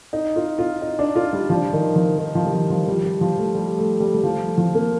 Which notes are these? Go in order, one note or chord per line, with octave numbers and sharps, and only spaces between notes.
D#4
F4
F4
D#4
D4
F4
G3
F3
D#3
F3
D#3
F3
G3
F3
F3
G3
G3
F3
A3
G3
A3
G3
G3
F3
F3
A#3